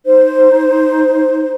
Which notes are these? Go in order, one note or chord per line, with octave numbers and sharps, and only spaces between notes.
D#4 C5